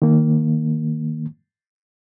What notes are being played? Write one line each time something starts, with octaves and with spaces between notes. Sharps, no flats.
D#3 A#3